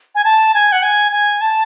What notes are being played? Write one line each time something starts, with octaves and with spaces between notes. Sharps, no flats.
G#5
A5
G#5
F#5
G#5
G#5
A5